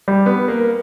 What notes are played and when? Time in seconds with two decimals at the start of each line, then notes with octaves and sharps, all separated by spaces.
0.08 G3
0.26 B3
0.48 A#3